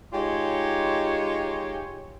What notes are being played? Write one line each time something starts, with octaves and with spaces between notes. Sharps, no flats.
G#3 D#4 F4 G4 C#5